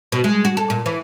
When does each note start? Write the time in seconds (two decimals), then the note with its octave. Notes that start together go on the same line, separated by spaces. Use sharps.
0.12 B2
0.24 G#3
0.45 F#4
0.57 A4
0.70 A#2
0.86 E3